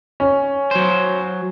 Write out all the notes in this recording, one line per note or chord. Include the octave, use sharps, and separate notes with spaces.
C#4
F#3 C5